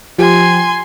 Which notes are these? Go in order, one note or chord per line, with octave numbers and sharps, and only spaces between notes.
F3 G4 G#5 C6